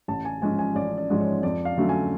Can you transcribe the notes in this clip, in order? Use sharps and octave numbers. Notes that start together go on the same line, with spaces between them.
A1 A5
G#5
G#2 F3 G#3 C#4 G#5
G#5
A1 D5
D5
G#2 F3 G#3 C#4
C#5
F2 D5
F5
D3 F#3 A3 C#4
G#5